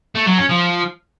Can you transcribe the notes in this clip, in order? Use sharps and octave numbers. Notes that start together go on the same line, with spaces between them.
A3
F#3
C#4
F3